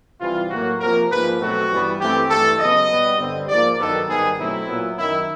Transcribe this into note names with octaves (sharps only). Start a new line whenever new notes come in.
C3 E3 G3 F4
A2 F#3 A#3 F#4
C3 F3 A#3 A#4
G#2 F3 A#3 B4
B2 F#3 A3 C4 F#4
G2 E3 G3 B3
G2 E3 A3 C4 G4
G2 E3 A3 A4
C#3 F#3 B3 D#5
B2 G3 B3
G2 D3 G3 C4
G#2 F3 A#3 D5
G2 D#3 F#3 B3 A4
G#2 D#3 G3 B3 G#4
B2 F#3 A3 C4 E4
A#2 F#3 B3
F#2 D#3 F#3 E4